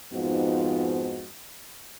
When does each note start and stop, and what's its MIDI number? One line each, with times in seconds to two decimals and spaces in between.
0.13 1.26 41
0.13 1.26 44
0.13 1.26 53
0.13 1.26 59
0.13 1.26 63
0.13 1.26 66